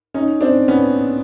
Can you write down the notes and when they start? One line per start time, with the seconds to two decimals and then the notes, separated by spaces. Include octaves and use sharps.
0.14 C#4 D#4
0.41 C4 D4
0.68 B3 C#4